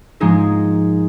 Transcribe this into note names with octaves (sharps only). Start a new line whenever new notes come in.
G#2 F3 G#3 A#3 D#4 G#4